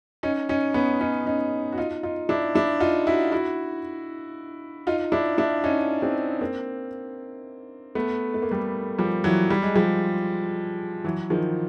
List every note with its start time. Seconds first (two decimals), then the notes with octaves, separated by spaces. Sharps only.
0.23 C#4 D#4
0.49 C#4 D#4
0.74 B3 C#4
1.01 C#4 D#4
1.26 C#4 D#4
1.72 F#4
1.78 D#4 F4
2.03 D#4 F4
2.29 D4 E4
2.55 D4 E4
2.80 D#4 F4
3.06 E4 F#4
3.32 E4 F#4
4.87 D#4 F4
5.12 D4 E4
5.38 D4 E4
5.64 C#4 D#4
6.02 C4 D4
6.41 A#3 C4
7.95 A3 B3
8.34 A3
8.42 A#3
8.51 G3 A3
8.98 F3 G3
9.24 E3 F#3
9.50 G3
9.63 G#3
9.75 F3 G3
11.04 E3 F#3
11.30 D#3 F3